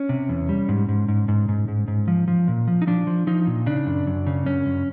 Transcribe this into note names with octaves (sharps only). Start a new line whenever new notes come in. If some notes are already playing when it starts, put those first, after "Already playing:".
Already playing: C#4
C3
E2
G3
G#2
G#2
G#2
G#2
G#2
G#2
G#2
F3
F3
A#2
F3
D#4
F3 D4
F3
F3 D#4
A#2
C#3 D4
F#2
F#2
C#3
F#2 C#4
F#2